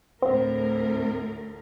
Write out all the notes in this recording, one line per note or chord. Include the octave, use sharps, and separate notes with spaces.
D2 A2 C4 A#4